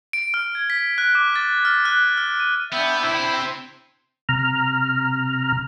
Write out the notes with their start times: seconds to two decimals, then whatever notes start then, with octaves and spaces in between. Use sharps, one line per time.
0.13 D7
0.34 F6
0.55 G#6
0.70 B6
0.98 F#6
1.15 D6
1.36 A6
1.65 F6
1.85 F#6
2.17 F6
2.40 D#7
2.73 B3 D4 E5 G5
3.03 C3 E4 C5
4.29 C3 A#5 F6